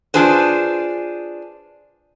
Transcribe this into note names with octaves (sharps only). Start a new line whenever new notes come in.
D4 F4 G#4 B4 C5